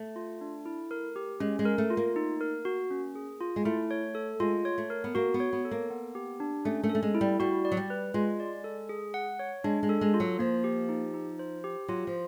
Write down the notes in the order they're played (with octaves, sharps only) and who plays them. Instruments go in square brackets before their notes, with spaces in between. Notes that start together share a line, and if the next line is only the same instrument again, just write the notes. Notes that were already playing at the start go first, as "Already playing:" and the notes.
Already playing: [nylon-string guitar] A3
[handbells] F4
D4
E4
A#4
G4
[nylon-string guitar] G#3 [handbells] C#4
[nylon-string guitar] G#3
[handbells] A#4
[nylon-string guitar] A3
[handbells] F4
[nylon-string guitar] A#3
[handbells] D#4
A#4
F#4
C#4
G#4
F4
[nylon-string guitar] G#3
[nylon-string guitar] A3 [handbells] E4
[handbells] C#5
A4
[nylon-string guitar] G#3 [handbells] F4
[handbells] C#5
[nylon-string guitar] A3
[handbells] A#4
[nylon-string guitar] B3
[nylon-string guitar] A#3 [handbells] F#4
[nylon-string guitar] B3
[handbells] C#5
[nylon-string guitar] B3
[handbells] A4
[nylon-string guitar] A#3
[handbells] B3
G4
D4
[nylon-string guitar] A3 [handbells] C#4
[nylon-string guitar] A3
[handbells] A4
[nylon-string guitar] A3
G#3
[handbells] E4
[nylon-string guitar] G3
[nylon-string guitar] G3 [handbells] F#4
[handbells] D5
[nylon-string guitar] F#3
G3
[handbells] B4
[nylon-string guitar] G#3 [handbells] F4
[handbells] D5
A4
G#4
F#5
C#5
[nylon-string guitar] G#3 [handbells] D4
[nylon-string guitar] G#3
[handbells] A4
[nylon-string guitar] G#3
[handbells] F4
[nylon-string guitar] F#3
[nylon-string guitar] F3 [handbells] A#3
[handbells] G4
D#4
D#4
C5
G4
[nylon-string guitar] F#3 [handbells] F4
[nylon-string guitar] F3